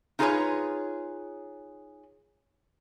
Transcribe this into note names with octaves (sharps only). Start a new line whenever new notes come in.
D#4 F4 G#4 A4 B4 C#5